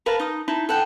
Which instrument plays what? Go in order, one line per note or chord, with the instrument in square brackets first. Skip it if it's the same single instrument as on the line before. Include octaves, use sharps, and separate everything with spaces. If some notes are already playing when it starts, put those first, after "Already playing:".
[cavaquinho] A#4 B4 F5 A5
D#4 D#6
D#4 E4 A5
A4 F#5 G5